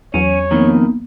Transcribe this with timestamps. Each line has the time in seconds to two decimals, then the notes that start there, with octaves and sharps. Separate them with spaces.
0.14 E2 F#3 C#4 C#5
0.51 F2 D#3 A#3 B3